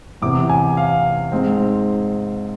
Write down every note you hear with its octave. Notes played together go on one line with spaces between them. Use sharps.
E2 C3 E3 D6
G#5
F5
G#2 G#3 C4